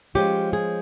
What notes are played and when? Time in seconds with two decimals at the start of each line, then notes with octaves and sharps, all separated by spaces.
0.15 F3 G#3 C#4 G4
0.53 G#4